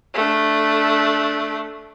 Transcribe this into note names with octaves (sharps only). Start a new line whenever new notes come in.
A3 D4